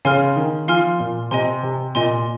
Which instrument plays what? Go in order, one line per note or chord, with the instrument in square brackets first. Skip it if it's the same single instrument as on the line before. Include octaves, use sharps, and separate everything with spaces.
[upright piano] C#3 [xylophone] F5 G#5 C6 F6
[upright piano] D#3
[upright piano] F3 [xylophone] F5 G#5 C6 F6
[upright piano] A#2
[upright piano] C3 [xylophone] D#5 G#5 C6
[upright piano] C3
[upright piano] A#2 [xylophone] D#5 G#5 C6